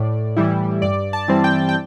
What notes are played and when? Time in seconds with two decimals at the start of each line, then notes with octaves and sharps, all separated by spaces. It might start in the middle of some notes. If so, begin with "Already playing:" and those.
Already playing: A2 D5
0.36 E3 G3 E4
0.82 G2 D5
1.13 A5
1.28 E3 G3 C4
1.44 G5
1.69 G5